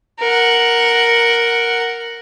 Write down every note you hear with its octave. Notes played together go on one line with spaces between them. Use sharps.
A#4 F#5